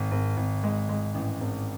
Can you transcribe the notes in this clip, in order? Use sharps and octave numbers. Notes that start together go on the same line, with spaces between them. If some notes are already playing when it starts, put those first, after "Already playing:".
Already playing: G#1
G#1
G#1
G#3
G#3
A1
G#1